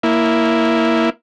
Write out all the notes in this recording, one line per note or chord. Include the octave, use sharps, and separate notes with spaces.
A#3 E4